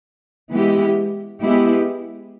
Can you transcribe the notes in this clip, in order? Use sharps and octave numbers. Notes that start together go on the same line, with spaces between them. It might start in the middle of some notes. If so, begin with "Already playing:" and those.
E3 G#3 B3 E4 G4
G#3 B3 E4 G4